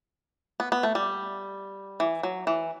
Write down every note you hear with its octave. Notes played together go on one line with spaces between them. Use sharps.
B3
B3
A3
G3
E3
F#3
E3